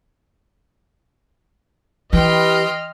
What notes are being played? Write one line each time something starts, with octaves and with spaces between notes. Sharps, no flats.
E3 G4 B4 D#5 G5 C6 F6